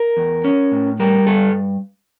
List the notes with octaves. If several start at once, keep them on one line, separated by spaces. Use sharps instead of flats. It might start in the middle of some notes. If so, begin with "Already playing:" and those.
Already playing: A#4
E2
C#4
A2
G3 A#4
G2 A4